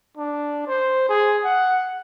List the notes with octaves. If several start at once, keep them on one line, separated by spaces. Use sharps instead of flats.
D4
C5
G#4
F#5